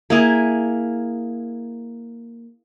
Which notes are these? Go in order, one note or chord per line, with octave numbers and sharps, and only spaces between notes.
A#3 E4 G#4